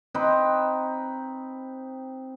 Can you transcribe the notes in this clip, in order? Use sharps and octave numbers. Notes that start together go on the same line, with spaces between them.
C4 D#4 B4 G5